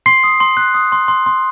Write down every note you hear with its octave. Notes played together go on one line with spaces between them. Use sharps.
C6 C7
D#6
C6
F#6
D#6
C6
C6
C6